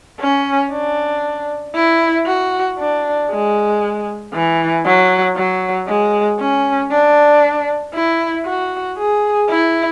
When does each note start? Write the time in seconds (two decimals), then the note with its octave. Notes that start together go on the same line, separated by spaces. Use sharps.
0.21 C#4
0.72 D4
1.75 E4
2.27 F#4
2.79 D4
3.31 G#3
4.34 E3
4.85 F#3
5.37 F#3
5.88 G#3
6.40 C#4
6.91 D4
7.94 E4
8.46 F#4
8.98 G#4
9.50 E4